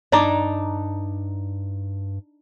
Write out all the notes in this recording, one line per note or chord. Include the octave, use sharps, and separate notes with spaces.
G2 D4 D#4 D5 A#5 D6